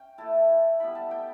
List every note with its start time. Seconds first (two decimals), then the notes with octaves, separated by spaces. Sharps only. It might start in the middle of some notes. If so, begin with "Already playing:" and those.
Already playing: C#4 G5
0.18 A3 E4 A5
0.80 G3 B3 E4 B5
0.95 A5
1.11 G5